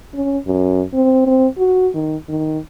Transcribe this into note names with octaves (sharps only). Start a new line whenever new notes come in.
C#4
F#2
C4
C4
F#4
D#3
D#3